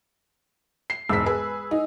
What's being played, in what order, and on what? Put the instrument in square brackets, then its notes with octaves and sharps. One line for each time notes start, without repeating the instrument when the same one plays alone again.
[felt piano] C7
[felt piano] E1 G#2 B6 [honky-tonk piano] E6
[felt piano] G#4 [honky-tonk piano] B4
[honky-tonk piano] D#4